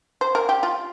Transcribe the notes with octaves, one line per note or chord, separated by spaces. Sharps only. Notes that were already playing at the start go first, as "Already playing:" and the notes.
C5
A#4
G4
F4